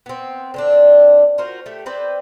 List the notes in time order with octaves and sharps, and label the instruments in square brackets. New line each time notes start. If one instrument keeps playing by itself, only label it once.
[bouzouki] B3 C4
D3 C4 D4
F4 F#4 A#4 C5
A3 G4
C4 B4 C5 D5